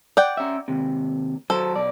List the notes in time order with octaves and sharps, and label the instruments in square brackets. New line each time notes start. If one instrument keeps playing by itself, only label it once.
[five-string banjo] D5 F#5 G5
[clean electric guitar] C#4 E5
D#2 C3
[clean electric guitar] F#3 C5 [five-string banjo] A4
[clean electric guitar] B1 D5